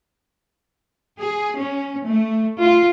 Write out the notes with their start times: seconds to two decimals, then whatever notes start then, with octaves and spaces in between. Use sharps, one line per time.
1.20 G#4
1.58 C#4
2.07 A3
2.61 F4